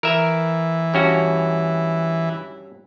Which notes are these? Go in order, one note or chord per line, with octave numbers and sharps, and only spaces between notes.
E3 A#4 E5
G2 C#4 F#4